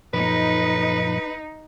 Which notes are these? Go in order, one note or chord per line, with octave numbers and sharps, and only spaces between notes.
F#2 A#2 F3 D#4 B4